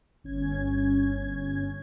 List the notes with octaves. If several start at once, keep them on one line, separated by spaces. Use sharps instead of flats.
G1 C#4 G#6